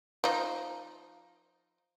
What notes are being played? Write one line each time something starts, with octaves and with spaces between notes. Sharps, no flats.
F3 D#4